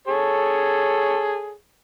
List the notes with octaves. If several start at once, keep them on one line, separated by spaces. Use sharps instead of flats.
G#4 A4 C#5